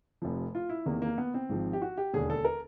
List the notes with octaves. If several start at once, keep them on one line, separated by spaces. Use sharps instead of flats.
F1 F2 C3 F3
F4
E4
E2 C3 D#3 A#3
A#3
B3
C4
G#1 G#2 F3
G4
F#4
G4
E1 D#2 D3 G#4
A4
A#4